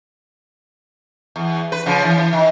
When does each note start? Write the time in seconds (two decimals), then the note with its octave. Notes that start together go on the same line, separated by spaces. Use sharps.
1.36 E2
1.72 B4
1.86 C#3 F3
2.05 E3
2.33 D#3